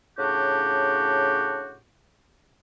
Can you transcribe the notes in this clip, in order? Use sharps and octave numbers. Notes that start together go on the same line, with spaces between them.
A2 C#3 D4 F#4 G4